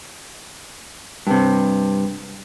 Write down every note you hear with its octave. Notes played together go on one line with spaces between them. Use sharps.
G2 C3